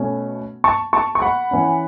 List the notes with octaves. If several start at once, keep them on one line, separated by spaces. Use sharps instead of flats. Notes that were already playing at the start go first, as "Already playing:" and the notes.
Already playing: B2 A3 C#4
A5 C#6
A5 C#6
C#6
F#5 B5
E3 C#4